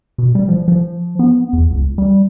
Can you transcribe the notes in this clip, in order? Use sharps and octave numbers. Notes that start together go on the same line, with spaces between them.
B2
G3
F3
F3
B3
E2
C#2
G3